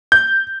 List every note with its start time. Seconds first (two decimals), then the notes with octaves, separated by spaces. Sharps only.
0.12 G6